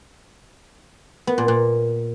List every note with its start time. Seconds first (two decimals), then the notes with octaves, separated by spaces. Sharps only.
1.27 B3
1.38 A#2
1.48 A#2